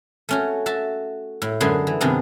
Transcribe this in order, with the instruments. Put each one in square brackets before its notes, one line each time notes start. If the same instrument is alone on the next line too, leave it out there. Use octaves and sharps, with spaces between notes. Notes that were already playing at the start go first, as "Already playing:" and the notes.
[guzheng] A3 C#4 F#4
F#4 E5 A5
A2
F#2 D3 G#3 G#4 B4 C6
E3
G2 C3 D#3 G#3 B3 D4